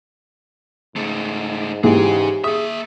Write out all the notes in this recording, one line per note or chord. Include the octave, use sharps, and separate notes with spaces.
G#2 C#3 A3
G#2 E3 C#4 G4 G#4
A#3 G#4 E5 D#6